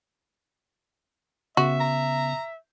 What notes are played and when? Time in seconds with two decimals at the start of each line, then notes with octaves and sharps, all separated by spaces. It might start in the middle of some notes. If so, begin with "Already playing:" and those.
1.57 C#3 B3 F#4 E5
1.80 A#5